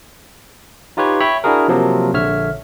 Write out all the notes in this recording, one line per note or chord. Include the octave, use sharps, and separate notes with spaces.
D#4 F4 G4 B4 C#5
C#5 E5 G5 B5
D4 E4 F#4 G#4 A#4
C3 F3 F#3 A#3
A#1 D3 C#5 E5 F6